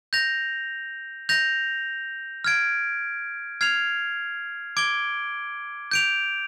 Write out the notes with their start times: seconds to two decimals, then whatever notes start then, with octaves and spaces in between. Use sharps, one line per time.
0.13 G6 A#6 F7
1.29 G6 A#6 F7
2.44 F6 G#6 D7
3.61 F6 G#6 C7 F7
4.77 D6 G#6 D7 G7
5.91 G6 D7 F7